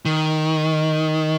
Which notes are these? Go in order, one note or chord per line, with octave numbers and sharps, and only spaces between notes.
D#3